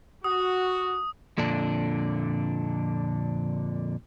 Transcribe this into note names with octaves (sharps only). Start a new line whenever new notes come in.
F#4 D#6
F2 A#2 D3 D4